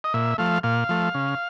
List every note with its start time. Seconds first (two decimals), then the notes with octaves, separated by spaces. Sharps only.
0.04 D#5
0.14 A#2 E5
0.38 F3 A3 F5
0.63 A#2 F5
0.89 F3 A3
1.14 C#3